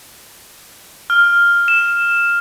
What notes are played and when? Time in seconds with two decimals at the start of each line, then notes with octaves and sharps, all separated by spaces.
1.10 F6
1.68 E7